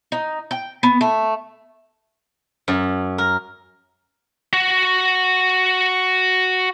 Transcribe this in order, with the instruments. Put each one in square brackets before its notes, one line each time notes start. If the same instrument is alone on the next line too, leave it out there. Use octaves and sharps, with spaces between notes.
[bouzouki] D#4
G5
B3
A3
[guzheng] F#2
A#4
[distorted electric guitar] F#4 F#5